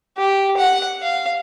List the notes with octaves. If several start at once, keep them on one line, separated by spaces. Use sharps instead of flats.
G4
F#5
F5